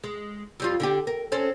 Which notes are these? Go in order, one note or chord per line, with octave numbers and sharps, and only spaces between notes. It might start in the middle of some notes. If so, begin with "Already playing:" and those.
G#3
F2 G3 F4
D3 E4 G4
A#4
C4 C#4 A4